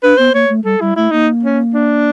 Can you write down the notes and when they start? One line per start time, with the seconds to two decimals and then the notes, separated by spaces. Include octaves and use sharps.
0.03 D4 B4
0.18 B3 C5
0.34 A#3 C#5
0.49 A3
0.65 G3 A4
0.81 G3 E4
0.96 A3 E4
1.11 A#3 D#4
1.43 C#4
1.74 D4